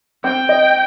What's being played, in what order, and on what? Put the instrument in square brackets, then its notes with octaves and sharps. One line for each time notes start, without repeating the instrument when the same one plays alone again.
[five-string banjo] C4 [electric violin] G5
[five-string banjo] D#5